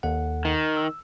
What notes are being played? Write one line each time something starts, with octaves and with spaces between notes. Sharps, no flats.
D#2 A4 F#5
D#3
E6